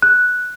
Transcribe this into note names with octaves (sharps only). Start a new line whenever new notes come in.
F#6